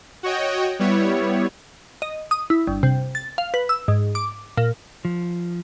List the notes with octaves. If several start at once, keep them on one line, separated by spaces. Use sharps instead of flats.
F#4 C#5 D#5 G5
G3 B3 E4 C#5
D#5
D#6
E4
G1
C3
A6
F5
B4
E6
G#2
D6
A#2
F3